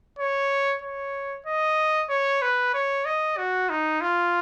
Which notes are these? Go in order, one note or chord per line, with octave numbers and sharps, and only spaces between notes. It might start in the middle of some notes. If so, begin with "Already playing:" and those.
C#5
C#5
D#5
C#5
B4
C#5
D#5
F#4
D#4
F4